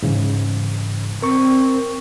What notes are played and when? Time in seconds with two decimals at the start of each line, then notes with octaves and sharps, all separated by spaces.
0.02 G#2 C#3 E3
1.22 C4 A#4 C#6